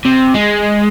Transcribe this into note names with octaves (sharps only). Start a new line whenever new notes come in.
C3
G#3